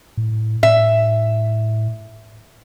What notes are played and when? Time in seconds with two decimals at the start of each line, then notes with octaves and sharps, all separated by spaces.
0.17 A2
0.63 A2 E5